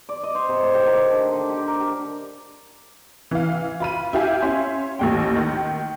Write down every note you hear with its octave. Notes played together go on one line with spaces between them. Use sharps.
D5
D#5
C5
C3
A2
G4
D#3
D3
D3
G4
A#4
G4
E3 F5
F4 B5 D#7
E4 G4 F5 G#5
C#4 E5 C6
A1 D#2 G5
D#3